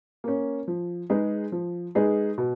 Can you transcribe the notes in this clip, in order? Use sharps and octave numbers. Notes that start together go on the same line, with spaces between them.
A#3 C#4
F3
G#3 D#4 G#4 B4
F3
G#3 D#4 G#4 B4
B2